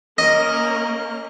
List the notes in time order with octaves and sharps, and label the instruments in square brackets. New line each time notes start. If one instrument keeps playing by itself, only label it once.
[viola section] A#3 C#4 A#4 [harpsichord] D#5